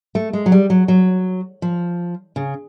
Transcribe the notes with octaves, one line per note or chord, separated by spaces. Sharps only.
A3
G#3
F#3
G3
F#3
F#3
F3
C#3